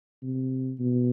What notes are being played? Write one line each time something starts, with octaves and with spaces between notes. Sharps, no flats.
C3
B2